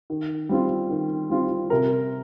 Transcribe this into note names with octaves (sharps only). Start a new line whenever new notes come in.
D#3
G3 C4 F4
D#3
G3 C4 F4
C3 A#4